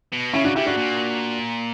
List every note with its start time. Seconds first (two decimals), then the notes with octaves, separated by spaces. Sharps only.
0.12 B2
0.34 C#3 C#4 E4
0.45 D4 F#4
0.55 C#3 E4 G4
0.66 D4 F#4
0.77 A#2